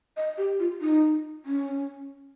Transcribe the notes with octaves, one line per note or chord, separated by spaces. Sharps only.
D#5
G4
F4
D#4
C#4